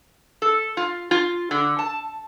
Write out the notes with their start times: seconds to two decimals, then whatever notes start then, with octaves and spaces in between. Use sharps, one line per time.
0.42 A4
0.77 F4
1.11 F4
1.51 D3
1.79 A5